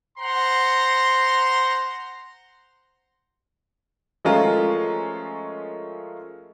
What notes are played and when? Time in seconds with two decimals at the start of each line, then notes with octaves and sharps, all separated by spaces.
0.18 C5 F#5 A#5 C6
4.25 F3 G#3 A3 C#4 F4 A#4